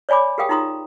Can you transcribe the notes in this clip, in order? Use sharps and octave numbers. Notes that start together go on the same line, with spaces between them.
C#5 D5 G#5 B5 D6
G4 G#4 A#4 F5 G5 D#6
D#4 F4 A#5 C6 D#6